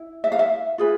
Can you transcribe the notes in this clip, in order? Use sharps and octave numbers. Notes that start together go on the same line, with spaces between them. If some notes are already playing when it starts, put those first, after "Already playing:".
Already playing: E4
E5
F5
E5
F4 G#4 B4